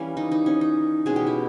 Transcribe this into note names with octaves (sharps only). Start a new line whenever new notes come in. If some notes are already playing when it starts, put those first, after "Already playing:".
Already playing: E3 G3 A#3 C#4
D#4
D#4
C#4
D#4
B2 G#3 C#4 G#4
G4
E4